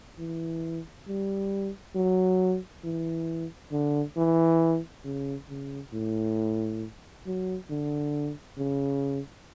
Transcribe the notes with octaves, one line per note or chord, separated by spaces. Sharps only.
E3
G3
F#3
E3
D3
E3
C#3
C#3
A2
F#3
D3
C#3